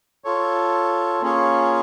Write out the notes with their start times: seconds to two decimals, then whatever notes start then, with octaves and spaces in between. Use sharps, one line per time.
0.24 F4 A4 C#5
1.21 A#3 C#4 F4 G#4 C#5